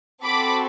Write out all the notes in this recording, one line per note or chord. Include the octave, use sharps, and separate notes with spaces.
C4 F#4 A4 B5 D6